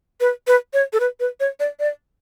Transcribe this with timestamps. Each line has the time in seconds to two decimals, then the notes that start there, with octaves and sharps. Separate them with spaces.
0.20 B4
0.47 B4
0.73 C#5
0.93 A4
1.00 B4
1.20 B4
1.40 C#5
1.60 D5
1.79 D5